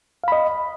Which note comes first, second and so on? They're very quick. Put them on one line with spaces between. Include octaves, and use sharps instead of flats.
F5 B5 D#5